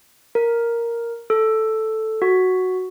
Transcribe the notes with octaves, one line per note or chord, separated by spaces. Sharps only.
A#4
A4
F#4